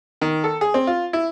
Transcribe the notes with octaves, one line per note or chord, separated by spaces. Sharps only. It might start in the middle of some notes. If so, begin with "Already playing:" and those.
D#3
A4
G#4
C4
F4
E4